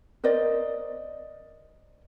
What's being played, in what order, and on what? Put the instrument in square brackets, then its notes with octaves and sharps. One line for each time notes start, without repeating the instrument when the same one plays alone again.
[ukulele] A#4 C5 D5 D#5